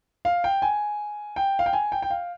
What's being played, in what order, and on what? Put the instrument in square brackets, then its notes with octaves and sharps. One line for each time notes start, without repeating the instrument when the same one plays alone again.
[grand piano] F5
G5
G#5
G5
F5
G5
G#5
G5
G5
F5